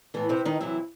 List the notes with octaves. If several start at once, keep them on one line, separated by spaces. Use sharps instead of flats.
A2 E3 B3
C3 C4
D#3 D#4
C3 E3 F#3 E4